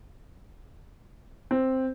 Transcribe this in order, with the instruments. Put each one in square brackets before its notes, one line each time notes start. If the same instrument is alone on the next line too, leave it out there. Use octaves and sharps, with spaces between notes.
[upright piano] C4